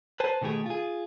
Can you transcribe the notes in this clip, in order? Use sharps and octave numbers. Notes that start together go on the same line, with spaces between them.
B4 C5 G#5 A5
B2 D#3 A3 G4 G#4
F4 G#4